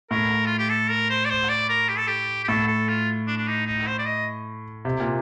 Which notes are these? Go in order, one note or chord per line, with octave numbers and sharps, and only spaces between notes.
A2 A#4
F4
G4
A4
A#4
C5
D5
C5
D5
A#4
G4
A4
G4
G4
A2 A4
A4
F4
D4
D4
D#4
D#4
C5
D5
D#5
C3
A#2